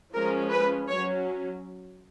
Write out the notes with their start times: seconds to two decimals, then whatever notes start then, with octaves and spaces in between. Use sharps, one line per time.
0.14 F3 G#3 C#4 A#4
0.51 B4
0.88 F#3 C#4 C#5